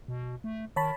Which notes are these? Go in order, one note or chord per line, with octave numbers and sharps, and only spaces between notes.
B2
A3
D#3 C#5 A5 B5